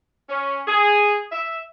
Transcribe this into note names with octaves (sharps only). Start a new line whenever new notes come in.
C#4
G#4
E5